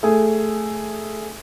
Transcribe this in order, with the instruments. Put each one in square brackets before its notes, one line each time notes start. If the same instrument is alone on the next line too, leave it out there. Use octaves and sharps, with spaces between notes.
[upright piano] A3 G#4